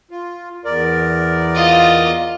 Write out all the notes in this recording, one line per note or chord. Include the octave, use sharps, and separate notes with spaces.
F4
E2 A#4 D5
F4 D#5